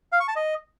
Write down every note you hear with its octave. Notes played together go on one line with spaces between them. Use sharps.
F5
C#6
A5
D#5